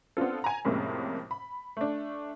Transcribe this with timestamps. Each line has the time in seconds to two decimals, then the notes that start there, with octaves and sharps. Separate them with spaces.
0.17 B3 C4 D4 F4 A4
0.44 G#5 A#5
0.65 F2 A2 C3 G#3 A#3 C#4
1.31 B5
1.77 A3 D4